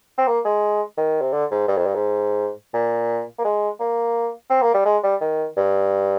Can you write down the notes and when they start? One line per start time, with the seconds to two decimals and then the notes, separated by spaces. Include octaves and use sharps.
0.18 C4
0.27 A#3
0.45 G#3
0.98 D#3
1.22 C3
1.33 D3
1.51 G#2
1.68 G2
1.77 F2
1.86 G2
1.95 G#2
2.74 A#2
3.39 A#3
3.45 G#3
3.80 A#3
4.50 C4
4.62 A#3
4.74 G3
4.85 G#3
5.03 G3
5.21 D#3
5.57 G2